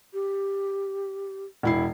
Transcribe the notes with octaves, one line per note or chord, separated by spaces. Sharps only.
G4
E1 E4 C7